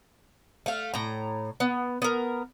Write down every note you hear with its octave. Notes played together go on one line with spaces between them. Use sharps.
A3 F5
A2 A#5
B3
B3 A#4